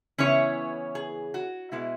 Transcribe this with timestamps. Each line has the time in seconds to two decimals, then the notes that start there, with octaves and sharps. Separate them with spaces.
0.18 C#3 E3 B3 C#4 E4 C#5
0.95 G#4
1.34 F#4
1.72 B2 G#3 B3 E4